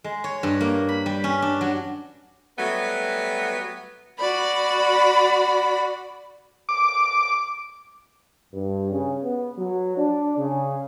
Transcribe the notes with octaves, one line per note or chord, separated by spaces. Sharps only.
G#3
C#5
G2
A#3
B5
G3
C#4
D4
F#3
F#3 G3 A3 B3
F#4 D5 B5
D6
G2
C#3
B3
F#3
D4
C#3